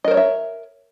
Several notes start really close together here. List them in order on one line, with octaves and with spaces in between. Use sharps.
D#5 A#4 C5 C#5 E5